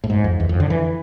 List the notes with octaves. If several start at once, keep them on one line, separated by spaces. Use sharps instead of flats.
A2
G#2
F2
E2
F2
D3
E3